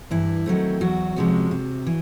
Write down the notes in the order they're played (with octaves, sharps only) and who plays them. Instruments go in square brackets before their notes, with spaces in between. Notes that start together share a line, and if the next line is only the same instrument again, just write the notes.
[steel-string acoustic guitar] G2 E3 E4
D#3 F#3 A3 C4
E2 F#3 F#4
C3 F3 G#3 C#4
C3
E3